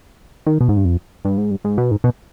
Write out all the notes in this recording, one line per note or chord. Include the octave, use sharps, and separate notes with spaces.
D#3
B2
G#2
G2
F2
G2
G#2
G2
G#2
B2
G#2
B2